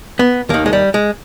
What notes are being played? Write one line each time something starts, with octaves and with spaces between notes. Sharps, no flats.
B3
D#2 D#3 A#3
G#3
G3
G#3